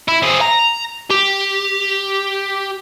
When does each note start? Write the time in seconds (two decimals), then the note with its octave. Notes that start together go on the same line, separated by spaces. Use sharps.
0.08 E4
0.23 C4 G#4
0.41 A#5
1.10 G4